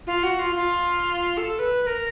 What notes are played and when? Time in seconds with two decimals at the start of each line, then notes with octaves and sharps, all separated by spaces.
0.07 F4
0.23 F#4
0.39 F4
0.55 F4
1.37 A4
1.59 B4
1.82 B4
1.87 A#4